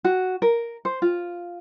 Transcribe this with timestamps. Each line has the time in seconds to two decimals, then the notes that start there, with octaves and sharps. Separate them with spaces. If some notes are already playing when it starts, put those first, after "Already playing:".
0.04 F#4
0.42 A#4
0.85 C5
1.02 F4